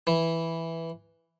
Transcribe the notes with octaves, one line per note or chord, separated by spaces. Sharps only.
E3